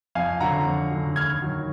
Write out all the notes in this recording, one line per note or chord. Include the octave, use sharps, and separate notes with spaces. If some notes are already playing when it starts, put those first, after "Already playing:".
F2 F5 G#5
D3 F#3 F#5 A#5
F2
D3 F#3
D#2 F6 G#6
D#3 F#3